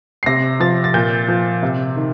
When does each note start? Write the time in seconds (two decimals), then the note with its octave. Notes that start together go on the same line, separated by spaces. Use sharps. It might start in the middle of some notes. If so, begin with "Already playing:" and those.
0.23 C7
0.26 C3 A#6
0.60 F3 A6
0.84 A6
0.94 A#2 G6
1.28 F3
1.63 C3
1.96 D#3